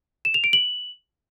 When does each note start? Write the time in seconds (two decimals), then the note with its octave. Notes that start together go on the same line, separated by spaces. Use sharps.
0.25 E7
0.34 F7
0.44 D7
0.53 F#7